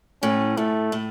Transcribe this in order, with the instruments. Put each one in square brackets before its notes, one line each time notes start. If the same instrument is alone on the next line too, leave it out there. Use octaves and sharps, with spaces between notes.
[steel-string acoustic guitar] A2 [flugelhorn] C#4
[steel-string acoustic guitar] A2 [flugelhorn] A3
[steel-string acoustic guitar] A2